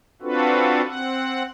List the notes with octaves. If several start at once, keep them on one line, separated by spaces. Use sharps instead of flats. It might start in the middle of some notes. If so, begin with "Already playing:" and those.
C4 D4 F4 F#4 A4 B4
C4 F#5